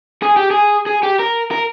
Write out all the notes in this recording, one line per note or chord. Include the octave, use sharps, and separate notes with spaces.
G#4
G4
G#4
G#4
G4
A#4
A#4